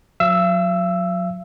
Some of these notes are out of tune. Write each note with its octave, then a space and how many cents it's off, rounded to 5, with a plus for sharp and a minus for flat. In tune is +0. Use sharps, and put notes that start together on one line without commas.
F#3 -30 F5 -45 E6 +0